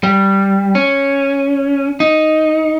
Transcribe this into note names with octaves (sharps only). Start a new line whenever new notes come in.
G3
C#4
D#4